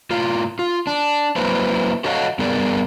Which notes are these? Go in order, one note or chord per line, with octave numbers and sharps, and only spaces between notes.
A2 F4
F4
D4
F#3 A#3 E4 B4 C5
F#4 A4 C#5 D#5 F5 F#5
G2 B3 G#4 A#4 D5